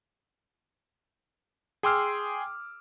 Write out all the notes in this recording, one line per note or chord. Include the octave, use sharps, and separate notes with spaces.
G#4 G5 C6 D6 E6 F6